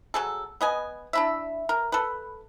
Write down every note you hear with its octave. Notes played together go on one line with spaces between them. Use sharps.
F#3 G#4 A4
B3 D#5 G#5
D4 E4 E5
A#4
A4 B4